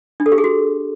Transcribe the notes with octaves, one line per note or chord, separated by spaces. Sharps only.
D4
A4
G4
G#4
F#4